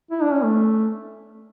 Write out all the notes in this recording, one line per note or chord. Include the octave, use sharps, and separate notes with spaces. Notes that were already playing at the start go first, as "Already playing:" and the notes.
E4
D4
C#4
A3